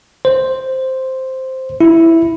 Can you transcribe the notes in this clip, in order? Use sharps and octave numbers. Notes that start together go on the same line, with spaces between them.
C5
E4